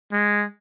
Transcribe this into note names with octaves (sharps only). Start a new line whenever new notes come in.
G#3